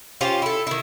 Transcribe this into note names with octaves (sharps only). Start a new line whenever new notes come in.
C#4 F4 G4 C5
E4 A4
D#3 E4